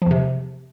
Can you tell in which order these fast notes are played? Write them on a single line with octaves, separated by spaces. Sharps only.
F3 E2 C3